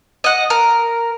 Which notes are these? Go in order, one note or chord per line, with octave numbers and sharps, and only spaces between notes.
D#5 F#5
A#4